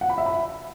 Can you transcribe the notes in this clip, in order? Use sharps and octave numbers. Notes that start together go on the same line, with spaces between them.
F#5
B5
E5
B5